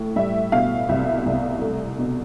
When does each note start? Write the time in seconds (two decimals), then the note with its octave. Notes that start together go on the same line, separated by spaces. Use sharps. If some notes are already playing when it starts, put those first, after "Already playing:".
Already playing: A2
0.16 G3 E5
0.52 B2 F5
0.89 C2 E5
1.25 C2
1.61 A3
1.98 B2